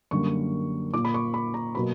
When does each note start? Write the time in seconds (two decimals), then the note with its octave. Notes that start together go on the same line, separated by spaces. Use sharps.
0.11 F#2 D3 G3 A#3 C#6
0.94 A#2 A#3 D6
1.05 B5
1.14 C#6
1.34 B5
1.54 A#5
1.75 B2 F#3 A#3 B5